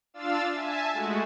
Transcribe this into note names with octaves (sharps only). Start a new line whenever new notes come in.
D4 F4 F5 E6 A6
E5 G#5 A5
G#3 A3 F#4